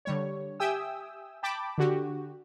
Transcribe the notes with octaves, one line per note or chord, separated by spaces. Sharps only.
D3 G3 C#5
G4 E5 G5 G#5 D#6 E6
G5 A5 B5 D6
D3 F#4 G4